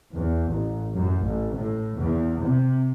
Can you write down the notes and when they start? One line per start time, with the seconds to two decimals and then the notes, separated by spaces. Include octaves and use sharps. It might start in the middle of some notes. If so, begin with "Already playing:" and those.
0.14 E2
0.54 A1
0.95 F#2
1.24 A1
1.58 A2
2.00 E2
2.43 C3